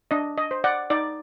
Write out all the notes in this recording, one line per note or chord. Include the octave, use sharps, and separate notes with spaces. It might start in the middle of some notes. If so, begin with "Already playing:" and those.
D4 D#5
D#5
C5
D5 F#5
D#4 D5